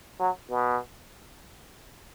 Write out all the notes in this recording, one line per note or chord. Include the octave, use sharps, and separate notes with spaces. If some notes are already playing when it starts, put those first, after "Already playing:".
F#3
B2